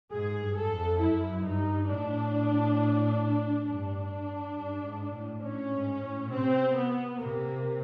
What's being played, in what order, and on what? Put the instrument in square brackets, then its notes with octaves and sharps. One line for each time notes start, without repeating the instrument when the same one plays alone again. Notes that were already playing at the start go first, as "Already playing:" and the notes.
[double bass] G#2 [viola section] G#4
[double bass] G2
[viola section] A4
[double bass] F2
[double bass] F#2 [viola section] E4
[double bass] G2 [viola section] D#4
[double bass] A2 [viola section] D4
[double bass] G2 [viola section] D4
[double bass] G2
G#2
A2
[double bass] A2 [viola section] C#4
[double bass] G#2
A2
[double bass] C3 [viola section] C4
[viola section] B3
[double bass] C3 [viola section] A#3